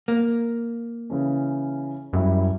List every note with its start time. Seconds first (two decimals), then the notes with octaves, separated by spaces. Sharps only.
0.08 A#3
1.10 C#3 E3 C#4
2.13 F#2 F#3 G3 E4